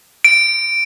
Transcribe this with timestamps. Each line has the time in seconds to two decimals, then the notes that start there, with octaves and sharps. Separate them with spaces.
0.24 D7